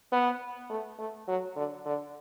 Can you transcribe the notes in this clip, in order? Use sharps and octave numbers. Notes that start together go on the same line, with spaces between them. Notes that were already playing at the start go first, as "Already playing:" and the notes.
B3
A3
A3
F#3
D3
D3